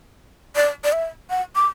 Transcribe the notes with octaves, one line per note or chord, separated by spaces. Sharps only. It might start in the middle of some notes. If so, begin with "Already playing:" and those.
D5
D5
E5
F#5
D6